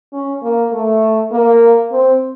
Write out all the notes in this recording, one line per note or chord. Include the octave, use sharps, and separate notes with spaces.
C#4
A#3
A3
A#3
C4